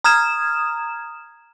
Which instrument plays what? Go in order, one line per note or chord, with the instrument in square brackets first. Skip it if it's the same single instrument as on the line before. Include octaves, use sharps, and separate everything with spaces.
[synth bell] A#5 D#6 F6 G#6 E7